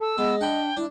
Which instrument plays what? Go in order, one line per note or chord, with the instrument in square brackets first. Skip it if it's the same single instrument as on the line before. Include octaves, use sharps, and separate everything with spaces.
[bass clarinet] A4 [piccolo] E6
[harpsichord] G#3 [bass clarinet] B3 [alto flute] D#5
[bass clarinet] D4 [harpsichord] F#5 B5 [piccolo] G5
[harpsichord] D4 [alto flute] E4